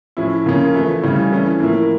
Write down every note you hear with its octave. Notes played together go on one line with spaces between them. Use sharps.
A2 F3 C#4 E4
C#3 F3 A#3 C#4 F4
E3 A3 E4
C#3 G3 C#4 E4
E3 A3 C#4
A2 F3 A#3 E4